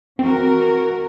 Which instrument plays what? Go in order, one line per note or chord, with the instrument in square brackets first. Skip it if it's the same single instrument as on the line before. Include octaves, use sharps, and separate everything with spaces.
[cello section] E3 F#4 A#4 [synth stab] C4